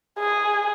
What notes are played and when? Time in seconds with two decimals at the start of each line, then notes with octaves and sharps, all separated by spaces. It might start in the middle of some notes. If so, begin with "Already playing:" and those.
0.19 G#4